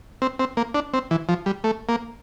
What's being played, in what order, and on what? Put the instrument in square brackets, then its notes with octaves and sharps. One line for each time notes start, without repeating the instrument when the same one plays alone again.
[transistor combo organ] C4
C4
A#3
D4
C4
E3
F3
G3
A3
A#3